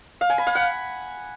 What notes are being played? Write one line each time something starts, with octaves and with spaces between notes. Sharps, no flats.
F5
G#5
B5
F5
F#5